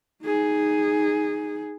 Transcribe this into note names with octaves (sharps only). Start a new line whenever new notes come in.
D#4 G#4